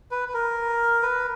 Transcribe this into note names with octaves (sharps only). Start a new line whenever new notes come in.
B4
B4
A#4
B4